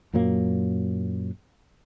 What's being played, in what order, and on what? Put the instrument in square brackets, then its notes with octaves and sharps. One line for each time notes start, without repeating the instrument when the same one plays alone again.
[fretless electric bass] F#2 A#2 F#3 A#3